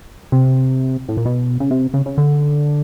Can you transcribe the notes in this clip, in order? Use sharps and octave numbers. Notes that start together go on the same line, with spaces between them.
C3
A2
A#2
B2
C#3
C3
C#3
C#3
D3